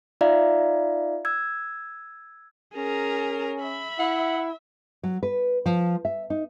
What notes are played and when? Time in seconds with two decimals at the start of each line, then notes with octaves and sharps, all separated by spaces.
0.21 D#4 F4 D5 E5 F5 A#5
1.25 E6 G#6
2.76 C#4 G#4 A#4 A#5
3.62 E5 B5
3.99 E4 F#5
5.03 F#3
5.23 B4
5.66 F3
6.05 E5
6.30 D#4